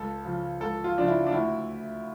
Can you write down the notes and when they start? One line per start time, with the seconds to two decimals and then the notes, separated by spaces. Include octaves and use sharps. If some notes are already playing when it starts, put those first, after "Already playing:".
Already playing: C#2 A4
0.25 C#3 F3
0.60 C#2 A4
0.84 F4
0.96 C#3 F3 D4
1.08 E4
1.27 D4
1.32 D2 E4